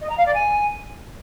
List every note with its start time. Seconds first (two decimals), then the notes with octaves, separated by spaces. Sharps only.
0.01 D#5
0.09 A#5
0.17 F5
0.26 D5
0.34 G#5